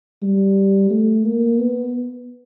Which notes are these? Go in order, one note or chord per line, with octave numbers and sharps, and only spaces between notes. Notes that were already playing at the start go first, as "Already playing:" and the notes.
G3
A3
A#3
B3